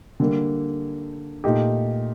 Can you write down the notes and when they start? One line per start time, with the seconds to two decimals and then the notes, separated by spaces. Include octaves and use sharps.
0.20 D3 G3 A#3
1.44 A#2 A3 D#4 G4